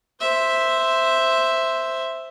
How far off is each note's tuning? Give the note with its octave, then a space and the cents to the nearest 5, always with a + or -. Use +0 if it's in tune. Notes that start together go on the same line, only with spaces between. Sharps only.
C5 +0 E5 +0